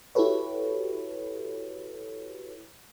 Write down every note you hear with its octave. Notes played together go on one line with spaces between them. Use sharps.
E4 F#4 G4 A4 B4 C#5